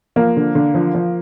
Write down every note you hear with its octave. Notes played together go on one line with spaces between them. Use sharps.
F3 A#3
D3
D3
F3
F3